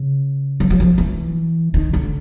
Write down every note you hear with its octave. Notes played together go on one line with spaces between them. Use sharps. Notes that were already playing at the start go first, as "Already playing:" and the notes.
Already playing: C#3
F#3
F#3
F3
E3
D#3
D3